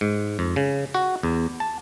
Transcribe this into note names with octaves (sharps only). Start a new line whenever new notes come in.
G#2
F2
C#3
F#4
E2
A5